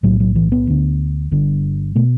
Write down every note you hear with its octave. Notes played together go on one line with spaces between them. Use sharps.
B1 A2 F#3
F#3
E3
B3
D2 D3
G1 G2 D3
B2 A3